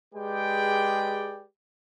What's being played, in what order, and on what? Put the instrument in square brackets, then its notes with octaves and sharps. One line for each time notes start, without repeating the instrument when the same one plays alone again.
[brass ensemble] G#3 G4 G#4 B4 D5 G5